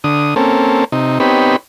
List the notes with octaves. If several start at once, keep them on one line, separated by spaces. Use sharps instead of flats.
D3 D#6
A#3 C4 C#4 A4
C3 D#4
B3 C4 D#4 G4 C#5 B5